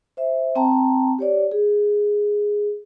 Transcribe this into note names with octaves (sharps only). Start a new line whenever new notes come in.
C5 E5
C4 G5 A5 A#5
G4 C#5 D5
G#4